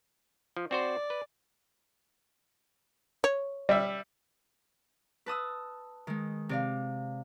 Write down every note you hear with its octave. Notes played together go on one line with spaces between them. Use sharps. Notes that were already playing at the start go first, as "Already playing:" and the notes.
F3
C4 F#4 C5 D5
B4
C#5
G3 E5
B4 A5 D#6 E6
D#3 G#3
C3 D5 F5